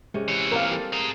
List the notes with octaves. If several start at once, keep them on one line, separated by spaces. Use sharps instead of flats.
C3 G#3 C#4
E3 C#5
A#3 C4 A#4 F5
G3 A4
G#4 A4 A#5